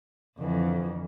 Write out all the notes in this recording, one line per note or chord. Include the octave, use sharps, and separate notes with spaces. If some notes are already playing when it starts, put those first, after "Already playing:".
F2 D3 E3